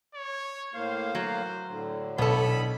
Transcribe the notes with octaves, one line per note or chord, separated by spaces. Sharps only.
C#5
A2 A#3 C5 F5
F#3
A2 D3
B1 B3 A4 B5